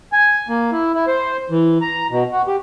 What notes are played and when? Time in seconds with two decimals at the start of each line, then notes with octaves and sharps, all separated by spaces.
0.13 G#5
0.49 A#3
0.72 E4
0.95 E4
1.07 C5
1.50 E3
1.81 A#5
2.11 B2
2.32 F#4
2.47 G4